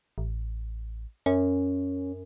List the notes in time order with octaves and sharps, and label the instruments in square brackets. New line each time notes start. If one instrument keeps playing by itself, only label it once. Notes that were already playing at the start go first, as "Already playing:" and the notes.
[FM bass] A1
[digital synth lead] F#2 [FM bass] C#4